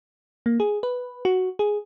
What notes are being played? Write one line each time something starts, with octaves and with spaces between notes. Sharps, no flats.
A#3
G#4
B4
F#4
G#4